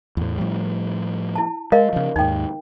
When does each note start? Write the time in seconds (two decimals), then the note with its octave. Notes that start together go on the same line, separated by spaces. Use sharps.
0.17 E2 A2
0.38 A2 F3 G3
1.35 E4 A5
1.72 G#3 A#4 D#5 F5
1.93 C#3 F3
2.16 D#2 G#2 D#4 G5